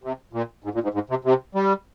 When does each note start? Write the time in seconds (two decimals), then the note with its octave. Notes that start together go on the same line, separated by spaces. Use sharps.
0.03 C3
0.33 A#2
0.64 G#2
0.74 A#2
0.83 G#2
0.94 G#2
1.10 C3
1.25 C3
1.55 G3